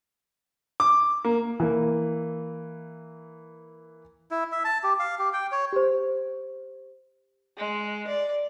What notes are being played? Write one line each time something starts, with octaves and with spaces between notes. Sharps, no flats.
D6
A#3
E3 A#3
E4
E5
A5
G4
F5
G4
G5
C#5
G4 C5
G#3
D5